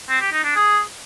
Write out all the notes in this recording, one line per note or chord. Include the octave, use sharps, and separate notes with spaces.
C4
G4
D#4
D4
G#4